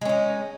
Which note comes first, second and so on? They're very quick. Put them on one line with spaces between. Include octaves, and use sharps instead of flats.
G#3 C#4 D#4